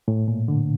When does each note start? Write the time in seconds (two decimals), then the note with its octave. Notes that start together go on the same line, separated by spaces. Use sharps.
0.08 A2
0.28 A#2
0.48 D3